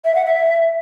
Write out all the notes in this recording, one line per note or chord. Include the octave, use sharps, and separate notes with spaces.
E5
F#5
E5